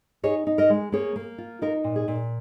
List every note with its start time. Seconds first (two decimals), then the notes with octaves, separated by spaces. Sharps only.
0.23 D#4 G#4 C#5
0.47 D#4
0.58 A#4 D#5
0.70 G#3
0.92 A#3 G#4 C#5
1.16 A#3
1.38 F4
1.62 D#4 F4 A#4
1.84 A#2
1.96 G#4
2.08 A#2